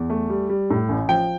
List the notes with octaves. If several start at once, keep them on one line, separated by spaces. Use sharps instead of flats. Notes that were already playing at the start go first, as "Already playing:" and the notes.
Already playing: E2
A3
G3
G3
A2
A1
F3 G5